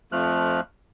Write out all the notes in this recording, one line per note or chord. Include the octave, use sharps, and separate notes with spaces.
F2 F3 A3 F6 F#6